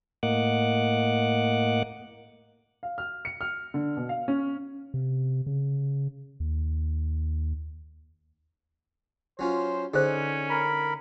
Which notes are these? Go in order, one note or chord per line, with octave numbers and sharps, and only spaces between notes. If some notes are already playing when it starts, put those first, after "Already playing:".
A2 A#3 D#5 F#5 D6 F#6
F5
F6
C#7
F6
D3
B2
F5
C#4
C3
C#3
D#2
F#3 C#4 F4 C5
D3 C#4 D#4 G#4 C5
A#4 B5